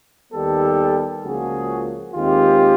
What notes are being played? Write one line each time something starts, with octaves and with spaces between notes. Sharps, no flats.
D#2 D#3 G3 B3 G4 A4
C#2 C#3 F3 A#3 F#4 G#4
D#2 D#3 G#3 C4 F4 G4